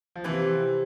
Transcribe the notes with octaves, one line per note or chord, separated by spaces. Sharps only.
F3
C3 E3 G3 C4 G4 C5